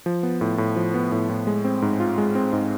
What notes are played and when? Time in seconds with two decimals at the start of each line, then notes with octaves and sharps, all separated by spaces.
0.06 F3
0.23 B3
0.41 A2
0.58 A2
0.76 F3
0.94 B3
1.12 A2
1.29 A2
1.47 G#3
1.64 C4
1.82 G#2
2.00 F4
2.18 G#3
2.35 C4
2.53 G#2